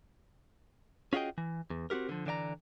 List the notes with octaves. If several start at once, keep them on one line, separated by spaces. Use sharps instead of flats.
C#4 F4 F#4 G#4 D#5 G5
E3
E2
C4 C#4 F#4 G4 A#4
D3 F3
D3 E3 D5 E5 A#5